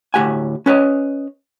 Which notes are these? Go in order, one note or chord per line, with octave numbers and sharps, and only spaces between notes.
D2 A2 G4 F#5 G#5
C#4 B4 C#5 D#5